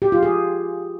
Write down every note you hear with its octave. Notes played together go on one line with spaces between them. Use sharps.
G4
F4
G#4